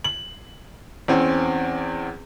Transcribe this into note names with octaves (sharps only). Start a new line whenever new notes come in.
F#7
E2 C4 C#4